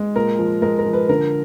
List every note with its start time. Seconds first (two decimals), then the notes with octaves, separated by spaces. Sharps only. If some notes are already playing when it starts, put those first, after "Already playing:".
Already playing: G#3
0.16 A#2 A#4
0.39 F3
0.62 G#3 A#4
0.79 A#4
0.86 F3
0.93 B4
1.09 D3 A#4